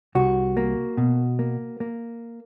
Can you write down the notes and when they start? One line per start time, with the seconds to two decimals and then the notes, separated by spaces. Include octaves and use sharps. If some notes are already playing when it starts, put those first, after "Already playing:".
0.15 C2 F#4
0.57 A#3
0.97 B2
1.39 A#3
1.80 A#3